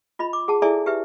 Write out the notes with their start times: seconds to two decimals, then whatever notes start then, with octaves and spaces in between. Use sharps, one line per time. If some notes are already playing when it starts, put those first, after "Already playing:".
0.19 F4 D#5 B5
0.33 D6
0.48 G#4 F#5 A5
0.62 E4 G#4 A4 D5 E5 G#5
0.86 G4 B4 E5